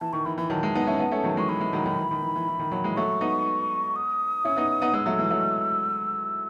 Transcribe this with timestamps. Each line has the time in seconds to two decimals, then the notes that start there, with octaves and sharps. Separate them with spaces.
0.01 E3 A5
0.13 D#3 C#6
0.25 E3 B5
0.37 E3 B5
0.50 D#3 F#3 A5
0.63 E3 G#3
0.75 B3 D#4
0.87 C#4 E4
0.99 B3 D#4
1.12 A3 C#4
1.24 D#3 F#3
1.36 E3 G#3 C#6
1.49 E3 B5
1.61 E3 G#3
1.73 D#3 F#3
1.86 D#3 F#3
1.98 E3
2.11 D#3
2.22 E3
2.36 E3
2.48 E3
2.59 D#3
2.71 D#3 F#3
2.84 E3 G#3
2.97 F#3 A3 C#6
3.21 B3 D#4
3.96 D#6
4.44 C#4 E4
4.56 B3 D#4
4.82 B3 D#4
4.93 G#3 B3 E6
5.06 F#3 A3
5.18 E3 G#3
5.30 F#3 A3